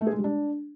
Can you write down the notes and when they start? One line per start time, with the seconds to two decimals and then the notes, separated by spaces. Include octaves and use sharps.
0.01 A3
0.07 G#4
0.12 G#3
0.18 G3
0.24 D4